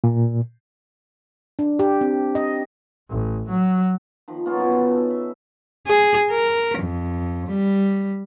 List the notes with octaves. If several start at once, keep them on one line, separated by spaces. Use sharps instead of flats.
A#2
D4
G4
C4
D#5
A1
F#3
D#3 F3
A#3 B3 C#4 F4
F#2 B2 G3 G#5
D#3 G3 F4
C#3 A4
E5
G#4
A#4
F2
G3